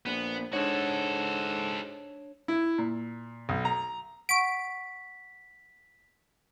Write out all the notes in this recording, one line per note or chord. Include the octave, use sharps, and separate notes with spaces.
A#1 B3
G#2 D4 F#4 A4 C#5
E4
A#2
B1
A#5
F#5 C#6 B6 D7